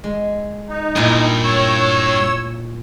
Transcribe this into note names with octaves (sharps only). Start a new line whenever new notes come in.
G#3
D#4
G2 A#2 E4 G#5
C#5 E6